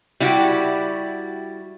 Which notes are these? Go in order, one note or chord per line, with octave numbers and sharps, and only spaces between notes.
G3 E4 F#4 G4